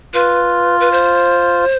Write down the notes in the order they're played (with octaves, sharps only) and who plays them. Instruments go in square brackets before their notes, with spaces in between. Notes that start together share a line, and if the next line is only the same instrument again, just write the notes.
[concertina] F4 [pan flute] B4
[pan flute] B4
C5